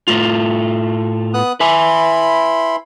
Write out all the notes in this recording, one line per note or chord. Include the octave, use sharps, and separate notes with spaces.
A2 A3 F4
B3 D#6 F#6
E4 B4 G#5 B5 C6